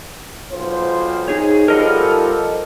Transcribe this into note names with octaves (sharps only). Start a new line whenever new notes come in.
B1 F4 C5
D#4 G#4 C#5
F3 G3 A4 A#4 D#5 F#5